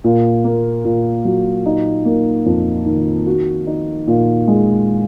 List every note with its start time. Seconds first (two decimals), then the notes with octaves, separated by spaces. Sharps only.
0.04 A#2
0.44 A#3
0.85 A#2
1.25 F#3
1.66 D#4
2.05 A#3
2.46 F2
2.86 D#3
3.27 F#4
3.67 D#4
4.07 A#2
4.48 G#3